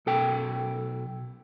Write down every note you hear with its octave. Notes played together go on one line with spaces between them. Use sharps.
B1 A4 G5